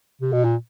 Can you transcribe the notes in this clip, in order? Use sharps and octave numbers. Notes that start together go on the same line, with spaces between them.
C3
B2
A#2